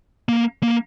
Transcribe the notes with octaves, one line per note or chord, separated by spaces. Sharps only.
A#3
A#3